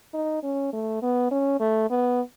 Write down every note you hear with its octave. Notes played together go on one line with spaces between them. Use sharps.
D#4
C#4
A3
B3
C#4
A3
B3